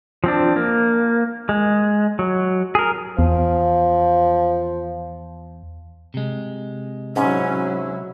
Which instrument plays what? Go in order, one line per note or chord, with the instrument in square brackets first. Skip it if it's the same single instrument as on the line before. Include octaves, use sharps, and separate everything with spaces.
[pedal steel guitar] F3 C4 D4
A#3
G#3
F#3
G#4 A#4
[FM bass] E2 [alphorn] F3
[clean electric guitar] C3 G#3
[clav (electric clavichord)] G#2 [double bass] F#3 E4 [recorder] C#4